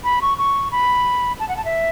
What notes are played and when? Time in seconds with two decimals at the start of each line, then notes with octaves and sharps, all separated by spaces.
0.04 B5
0.22 C#6
0.38 C#6
0.72 B5
1.40 A5
1.49 F#5
1.57 A5
1.65 E5